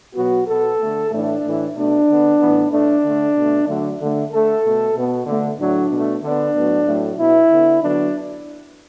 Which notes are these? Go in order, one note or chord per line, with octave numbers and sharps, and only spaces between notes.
B2 F#3 B3 F#4
B2 B3 A4
D3 A3
A2 E3 A3 D4
A2 E3 A3
B2 A3 D4
D3 B3
A2 E3 B3
A2 A3 D4
D3 A3
B2 A3
D3 F#3 A3
D3 A3
D3 A3 A4
B2 A3
B2 B3
D3 A3
A2 F#3 A3 D4
B2 A3
D3 B3 D4
A2 F#3 B3
A2 F#3 A3
B2 B3 E4
D3 B3
D3 F#3 B3 D4